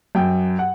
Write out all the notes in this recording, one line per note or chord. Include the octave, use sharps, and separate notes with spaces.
F#2 G5
F#5